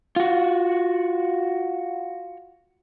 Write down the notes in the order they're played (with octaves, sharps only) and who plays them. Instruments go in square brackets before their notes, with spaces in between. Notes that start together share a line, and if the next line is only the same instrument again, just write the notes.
[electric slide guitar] F4 F#4